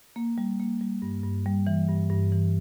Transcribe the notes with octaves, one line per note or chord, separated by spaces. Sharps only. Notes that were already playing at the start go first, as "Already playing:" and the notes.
A#3
G3
A#3
G3
G2
G2
G3
E3
G2
G2
E3